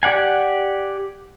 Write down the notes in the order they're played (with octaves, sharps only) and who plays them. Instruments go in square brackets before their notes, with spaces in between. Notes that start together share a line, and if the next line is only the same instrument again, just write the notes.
[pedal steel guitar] G4 D5 F#5 G#5